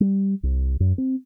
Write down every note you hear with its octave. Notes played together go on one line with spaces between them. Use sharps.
G3
C2
F#2
C4